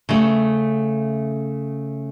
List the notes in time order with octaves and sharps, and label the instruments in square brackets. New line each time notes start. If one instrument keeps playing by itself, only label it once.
[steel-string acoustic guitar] C#3 A3